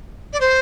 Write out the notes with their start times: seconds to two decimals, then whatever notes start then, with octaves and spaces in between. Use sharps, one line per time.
0.33 D5
0.40 C5